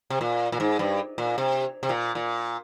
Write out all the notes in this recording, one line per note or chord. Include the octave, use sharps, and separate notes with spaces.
C3
A#2
A#2
G#2
G2
A#2
C3
C3
A#2
A#2